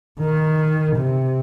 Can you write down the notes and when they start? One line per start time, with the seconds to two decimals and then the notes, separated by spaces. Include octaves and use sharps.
0.20 D#3
0.97 C3